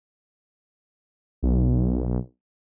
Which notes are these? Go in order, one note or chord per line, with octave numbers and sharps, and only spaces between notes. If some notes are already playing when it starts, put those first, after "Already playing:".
B1